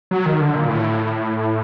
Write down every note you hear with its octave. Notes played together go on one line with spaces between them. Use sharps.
F#3
D#3
D3
A#2
A2